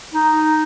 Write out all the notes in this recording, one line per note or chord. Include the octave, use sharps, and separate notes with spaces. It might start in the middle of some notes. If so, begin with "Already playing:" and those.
D#4